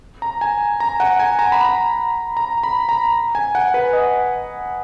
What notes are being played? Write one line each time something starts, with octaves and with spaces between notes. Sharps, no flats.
A#5
G#5
A#5
F#5
G#5
A#5
B5
A#5
A#5
B5
A#5
G#5
F#5
B4
D#5